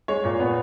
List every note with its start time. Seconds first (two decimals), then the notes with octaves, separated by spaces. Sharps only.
0.08 G#3 C#5
0.24 A#2 C#5
0.40 B3